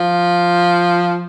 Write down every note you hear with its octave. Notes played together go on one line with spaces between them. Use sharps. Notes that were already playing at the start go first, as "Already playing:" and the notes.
Already playing: F3